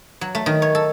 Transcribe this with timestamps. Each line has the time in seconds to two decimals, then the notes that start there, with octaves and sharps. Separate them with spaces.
0.21 F#3
0.35 A3
0.46 D#3
0.62 C#5
0.75 A4